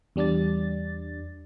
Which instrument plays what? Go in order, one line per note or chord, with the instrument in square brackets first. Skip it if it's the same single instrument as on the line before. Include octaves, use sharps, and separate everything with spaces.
[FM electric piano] E2 G3 D4 D5 A6